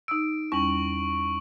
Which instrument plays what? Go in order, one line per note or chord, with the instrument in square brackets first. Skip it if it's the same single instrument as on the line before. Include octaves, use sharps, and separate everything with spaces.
[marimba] D#4 E6 [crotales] D7
[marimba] E2 G3 C#4 [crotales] C#6 F#7